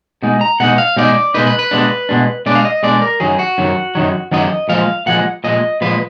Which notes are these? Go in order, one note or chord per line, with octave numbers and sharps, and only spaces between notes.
B2 G#3 D#4
A#5
B2 G#3 D#4 F#5
F5
B2 G#3 D#4 D5
B2 G#3 D#4 B4
B4
B4
B2 G#3 D4
B2 G#3 D4
B2 G#3 D4 D5
F5
D#5
B2 G#3 D4 D5
A#4
F#2 D#3 F#3 G#4
F#4
F#2 D#3 F#3
F#2 D#3 F#3
F#2 D#3 F#3 D#5
A#2 F3 G#3 F5
A#2 F3 G#3 F#5
A#2 F3 G#3 D#5
A#2 F3 G#3 B4